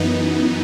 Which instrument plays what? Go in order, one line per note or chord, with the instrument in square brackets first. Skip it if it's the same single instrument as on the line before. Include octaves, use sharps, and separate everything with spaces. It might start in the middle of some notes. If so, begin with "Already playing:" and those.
Already playing: [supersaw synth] F#2 E3 B3 D#4